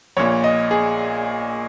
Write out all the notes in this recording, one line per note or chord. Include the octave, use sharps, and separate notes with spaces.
A#1 A#2 C#5
D#5
G#4